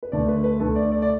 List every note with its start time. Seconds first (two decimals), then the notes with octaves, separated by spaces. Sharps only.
0.03 B4
0.12 D2 D3 A3 D5
0.28 B4
0.44 B4
0.60 D2 D3 A3 A4
0.76 D5
0.92 D5
1.02 D5